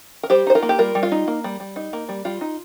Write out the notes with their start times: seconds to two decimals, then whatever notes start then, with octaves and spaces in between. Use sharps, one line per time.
0.23 A#4
0.30 G3 G4 C5
0.47 D#4 C5
0.55 F4 A#4
0.63 A#3
0.69 G4
0.78 G3 F4 A#4
0.95 G3
1.03 F4
1.12 D#4
1.28 A#3
1.44 G3
1.60 G3
1.76 D#4
1.93 A#3
2.09 G3
2.25 G3 F4
2.41 D#4